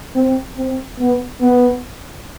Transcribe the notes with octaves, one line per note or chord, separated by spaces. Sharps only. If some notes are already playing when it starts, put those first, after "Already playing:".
C4
C4
B3
B3